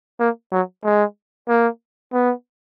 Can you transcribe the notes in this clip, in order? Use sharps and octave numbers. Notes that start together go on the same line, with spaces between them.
A#3
F#3
G#3
A#3
B3